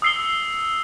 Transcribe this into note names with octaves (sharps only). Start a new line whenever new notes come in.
D#6 E6 C7 C#7 G7